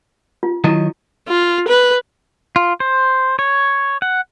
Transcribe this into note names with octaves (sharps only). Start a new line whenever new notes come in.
F4
D#3 F#3 E4 D#5
F4
B4
F4
C5
C#5
F#5